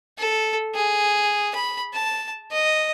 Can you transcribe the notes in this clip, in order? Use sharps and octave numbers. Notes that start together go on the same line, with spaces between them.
A4
G#4
B5
A5
D#5